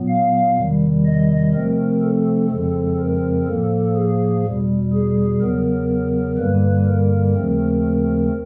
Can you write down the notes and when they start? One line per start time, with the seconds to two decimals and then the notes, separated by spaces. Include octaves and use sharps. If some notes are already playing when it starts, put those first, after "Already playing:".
Already playing: A#2 F#3 B3
0.09 F5
0.57 E2 C3 D#3 G3
1.06 D#5
1.54 C3 F3 A3 C4 A#4
2.02 A4
2.50 F2 C#3 F3 G#3 C4 A4
3.00 A#4
3.47 A2 F3 A#3 A4
3.95 G#4
4.44 E2 B2 G3
4.93 G#4
5.41 E2 C#3 F#3 B3 A#4
6.37 G2 D3 G3 A#3 B4
6.86 A#4
7.35 D#2 C#3 F3 A3 C4